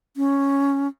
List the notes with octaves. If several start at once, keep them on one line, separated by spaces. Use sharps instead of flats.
C#4